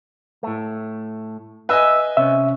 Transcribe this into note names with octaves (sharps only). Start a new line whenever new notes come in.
A2 A3
B4 D#5 E5 G#5
C3 C#4 E5